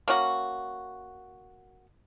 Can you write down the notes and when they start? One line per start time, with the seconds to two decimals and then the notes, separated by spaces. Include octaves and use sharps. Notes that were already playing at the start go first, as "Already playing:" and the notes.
0.08 A#3 C#4 F#4